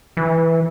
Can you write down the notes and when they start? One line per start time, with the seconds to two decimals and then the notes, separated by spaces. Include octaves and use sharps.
0.17 E3